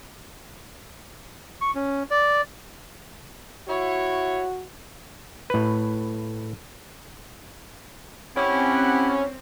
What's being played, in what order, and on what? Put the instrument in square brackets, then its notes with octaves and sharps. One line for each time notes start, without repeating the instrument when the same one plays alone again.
[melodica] C#6
C#4
D5
[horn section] E4 C#5 [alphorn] F#4
[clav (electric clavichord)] A2 B4
[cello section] C4 [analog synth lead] C#4 [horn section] E4 G4 F#5